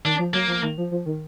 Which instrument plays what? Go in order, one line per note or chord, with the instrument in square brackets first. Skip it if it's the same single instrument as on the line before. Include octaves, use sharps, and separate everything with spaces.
[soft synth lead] D#3 [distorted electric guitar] D4
[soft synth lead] F3
[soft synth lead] F#3 [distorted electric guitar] A#3
[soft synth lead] F3
D#3
F3
F3
D#3